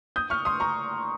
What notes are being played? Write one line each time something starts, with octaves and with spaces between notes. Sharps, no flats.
D#6 G6
C#6 F6
C6 D#6
A#5 C#6